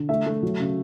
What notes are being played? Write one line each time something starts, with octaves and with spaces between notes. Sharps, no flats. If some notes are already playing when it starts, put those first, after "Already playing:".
Already playing: D3
A3 E5
A3
F#3
C#3